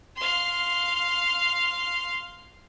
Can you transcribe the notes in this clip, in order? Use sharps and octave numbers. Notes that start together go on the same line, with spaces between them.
F5 C6